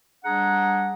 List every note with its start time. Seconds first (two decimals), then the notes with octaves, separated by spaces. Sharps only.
0.25 G3 D4 G#4 F#5 A#5